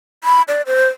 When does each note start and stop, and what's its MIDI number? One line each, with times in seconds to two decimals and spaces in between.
0.24 0.42 83
0.48 0.62 74
0.67 0.88 72